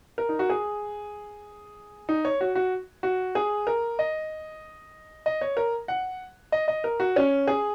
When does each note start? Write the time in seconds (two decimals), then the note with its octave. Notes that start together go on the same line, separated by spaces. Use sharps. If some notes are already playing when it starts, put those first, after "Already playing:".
0.18 A#4
0.29 D#4
0.39 F#4
0.50 G#4
2.09 D#4
2.25 C#5
2.41 F#4
2.55 F#4
3.03 F#4
3.35 G#4
3.67 A#4
3.99 D#5
5.26 D#5
5.41 C#5
5.57 A#4
5.88 F#5
6.52 D#5
6.68 D#5
6.84 A#4
7.00 F#4
7.16 C#4
7.47 G#4